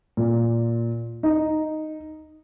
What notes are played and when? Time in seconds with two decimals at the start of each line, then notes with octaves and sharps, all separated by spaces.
0.17 A#2
1.23 D#4